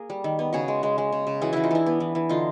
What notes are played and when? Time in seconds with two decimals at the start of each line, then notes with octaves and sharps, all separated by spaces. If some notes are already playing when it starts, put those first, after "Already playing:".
Already playing: A#3 G#4 A#4
0.10 G3
0.24 D#3
0.39 B3
0.53 C#3 F#4 G#4
0.68 G#3
0.83 G#3
0.98 G#3
1.12 C#3
1.27 C#3
1.41 E3 F#4 G#4
1.53 E3 E4 F#4
1.64 D#4 F4
1.71 E3 D4 E4
1.86 B3
2.00 E3
2.15 E3
2.29 D3 D#4 F4